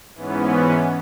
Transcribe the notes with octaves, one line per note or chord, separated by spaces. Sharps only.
G#2 E3 B3 C#4